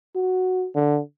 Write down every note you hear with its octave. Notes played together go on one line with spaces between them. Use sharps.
F#4
D3